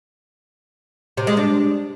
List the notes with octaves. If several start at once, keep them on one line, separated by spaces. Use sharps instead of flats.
C3
G#3
D4